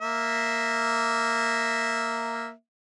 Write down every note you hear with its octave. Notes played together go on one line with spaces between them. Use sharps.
A#3 E5